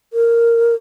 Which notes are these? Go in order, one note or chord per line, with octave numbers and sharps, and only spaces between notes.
A#4